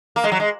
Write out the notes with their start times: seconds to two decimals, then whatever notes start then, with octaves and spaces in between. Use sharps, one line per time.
0.16 A#3
0.24 G#3
0.32 F#3
0.40 G#3